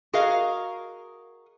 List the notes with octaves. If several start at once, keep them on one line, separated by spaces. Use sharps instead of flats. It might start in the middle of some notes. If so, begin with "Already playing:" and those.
F#4 G#4 A#4 D#5 F5